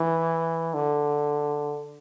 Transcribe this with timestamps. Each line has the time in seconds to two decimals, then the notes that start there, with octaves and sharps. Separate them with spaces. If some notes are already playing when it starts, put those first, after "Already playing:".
Already playing: E3
0.74 D3